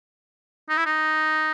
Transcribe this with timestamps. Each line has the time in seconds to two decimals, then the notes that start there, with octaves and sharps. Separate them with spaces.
0.69 D#4
0.77 E4
0.85 D#4